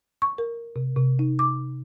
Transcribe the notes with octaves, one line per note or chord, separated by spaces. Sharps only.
C#6
A#4
C3
C3
D#4
D6